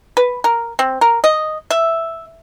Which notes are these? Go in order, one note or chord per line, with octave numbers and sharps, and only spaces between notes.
B4
A#4
C4
A#4
D#5
E5